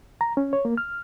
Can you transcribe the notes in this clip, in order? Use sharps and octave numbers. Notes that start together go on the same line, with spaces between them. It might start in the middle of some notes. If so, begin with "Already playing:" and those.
A#5
C#4
C#5
A#3
F6